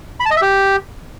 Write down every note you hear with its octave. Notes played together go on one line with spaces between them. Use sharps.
B5
A5
D#5
E5
G4